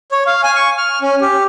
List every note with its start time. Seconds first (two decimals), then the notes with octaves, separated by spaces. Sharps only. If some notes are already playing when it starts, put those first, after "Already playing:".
0.12 C#5
0.27 F5
0.43 G#5
0.55 C#6
0.78 F6
1.01 C#4
1.21 G4